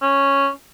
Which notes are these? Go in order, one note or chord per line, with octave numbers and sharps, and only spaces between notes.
C#4